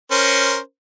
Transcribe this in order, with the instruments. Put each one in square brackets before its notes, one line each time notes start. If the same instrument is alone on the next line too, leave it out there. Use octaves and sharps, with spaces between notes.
[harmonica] C#4 A#4 C5